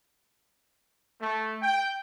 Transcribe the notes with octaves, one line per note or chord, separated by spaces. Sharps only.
A3
G5